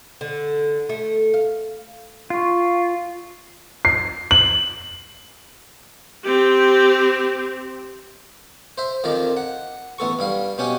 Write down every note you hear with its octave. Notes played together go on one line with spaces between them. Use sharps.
D3
A3
F5
F4 F5 C#6
C7
F#7
C4 G4
C5 E5
F2 D#3 F3 D5 A#5
F#5
A1 B3 A4 C#6
G2 G3 F5
B2 C#4 G4 F#5 G#5